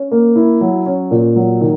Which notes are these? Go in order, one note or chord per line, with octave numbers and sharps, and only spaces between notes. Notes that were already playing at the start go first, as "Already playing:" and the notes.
Already playing: C#4
A#3
E4
F#3
C#4
A#2
F#3
D#3